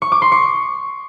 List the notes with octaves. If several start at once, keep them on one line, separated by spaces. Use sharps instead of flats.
C#6
D6
C6
C#6